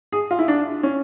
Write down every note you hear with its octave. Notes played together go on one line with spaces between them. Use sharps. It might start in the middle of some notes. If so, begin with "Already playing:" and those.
G#4
F4
E4
D4
C#4